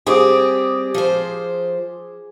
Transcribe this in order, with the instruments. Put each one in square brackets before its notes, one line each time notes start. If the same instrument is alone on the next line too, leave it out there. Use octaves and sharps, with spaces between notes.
[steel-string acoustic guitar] G3 C4 G4 [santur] G#4 D6 D#6
[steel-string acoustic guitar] F3 C5